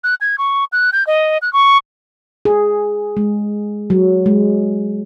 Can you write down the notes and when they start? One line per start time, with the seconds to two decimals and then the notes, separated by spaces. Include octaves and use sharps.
0.04 F#6
0.21 G#6
0.38 C#6
0.72 F#6
0.93 G6
1.07 D#5
1.42 F#6
1.53 C#6
2.45 G#4
3.17 G#3
3.90 F#3
4.26 G#3